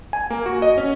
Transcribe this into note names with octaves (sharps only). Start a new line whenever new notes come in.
G#5
A#3
F#4
D#5
C#4